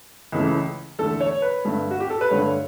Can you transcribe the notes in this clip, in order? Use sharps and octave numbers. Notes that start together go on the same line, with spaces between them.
C#2 C#3 E3 A3
E2 D3 A3 A4
C#5
B4
G2 D3 A3
F#4
G4
A4
B4
G2 D3 A3 C#5